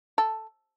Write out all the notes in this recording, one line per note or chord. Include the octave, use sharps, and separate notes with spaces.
A4